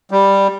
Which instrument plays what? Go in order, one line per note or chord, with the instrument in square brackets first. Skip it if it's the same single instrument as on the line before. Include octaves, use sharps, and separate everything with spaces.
[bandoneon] G3